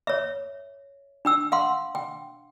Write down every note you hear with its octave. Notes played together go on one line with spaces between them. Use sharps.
C#5 E5
D4 G5 E6
F5 F#5 C6
G5